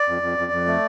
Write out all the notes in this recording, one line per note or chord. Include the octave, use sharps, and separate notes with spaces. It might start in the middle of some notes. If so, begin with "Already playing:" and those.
Already playing: D5
F2
F2
F2
F2
A3